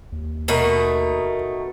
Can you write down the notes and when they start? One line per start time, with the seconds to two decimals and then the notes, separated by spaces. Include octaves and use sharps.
0.12 D#2
0.48 B2 A3 D#4 A#4 B5